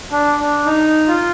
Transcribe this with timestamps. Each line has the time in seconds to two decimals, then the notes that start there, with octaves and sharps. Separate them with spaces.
0.12 D4
0.39 D4
0.66 D#4
1.08 F4